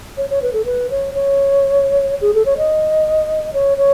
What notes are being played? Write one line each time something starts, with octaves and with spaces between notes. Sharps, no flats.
C#5
C#5
B4
A4
B4
C#5
C#5
G#4
A4
C#5
D#5
C#5
C#5